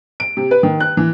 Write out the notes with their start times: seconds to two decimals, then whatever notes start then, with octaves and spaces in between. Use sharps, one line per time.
0.20 D7
0.37 C3
0.51 B4
0.63 D#3
0.80 F#6
0.97 E3